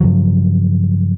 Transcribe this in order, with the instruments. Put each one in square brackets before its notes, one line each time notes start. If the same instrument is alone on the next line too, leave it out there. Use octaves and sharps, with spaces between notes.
[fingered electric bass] G2 C#3 F3 F#3